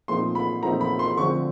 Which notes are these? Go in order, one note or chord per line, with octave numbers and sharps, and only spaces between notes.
A#2 F3 A3 C4 D#4 C6
B5
A#2 F3 A3 C4 D#4 A#5
B5
C6
D3 F3 A3 C4 C#6